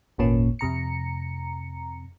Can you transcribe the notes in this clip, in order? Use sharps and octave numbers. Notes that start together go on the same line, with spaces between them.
G#1 E2 A#2 A#3 C#4
F2 C3 A#5 C#7